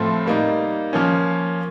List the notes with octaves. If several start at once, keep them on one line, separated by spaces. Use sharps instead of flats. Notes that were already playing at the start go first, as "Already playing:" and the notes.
Already playing: A2 F3 A3 C4 F4
G3 A#3 D#4
F3 A#3 C#4